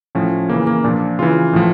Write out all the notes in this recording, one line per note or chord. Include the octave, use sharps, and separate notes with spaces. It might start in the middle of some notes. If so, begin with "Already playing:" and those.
A2 F3 C#4
C#3 E3 A#3
A#3
A#2 F3 D4
C#3 E3 F4
A2 F3